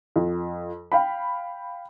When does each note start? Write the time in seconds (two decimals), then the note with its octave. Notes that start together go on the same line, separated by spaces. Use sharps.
0.16 F2
0.92 F5 G5 B5